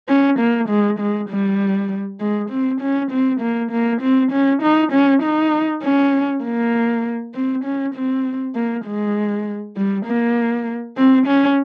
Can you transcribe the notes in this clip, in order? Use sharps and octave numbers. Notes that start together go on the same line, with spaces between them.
C#4
A#3
G#3
G#3
G3
G#3
C4
C#4
C4
A#3
A#3
C4
C#4
D#4
C#4
D#4
C#4
A#3
C4
C#4
C4
A#3
G#3
G3
A#3
C4
C#4